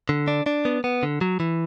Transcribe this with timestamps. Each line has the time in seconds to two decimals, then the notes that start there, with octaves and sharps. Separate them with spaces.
0.09 D3
0.28 D4
0.46 D4
0.65 B3
0.84 B3
1.03 D3
1.21 F#3
1.40 E3